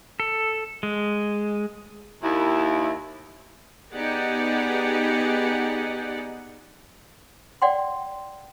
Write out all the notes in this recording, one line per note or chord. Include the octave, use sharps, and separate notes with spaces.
A4
G#3
D#2 E4
B3 D#4 G4 G#4 D5 F#5
D5 F#5 G5 C6